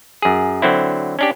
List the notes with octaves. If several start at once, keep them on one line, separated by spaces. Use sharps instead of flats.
F#2 G#4
D3 F#3 C4 E4
C#4 D4 G4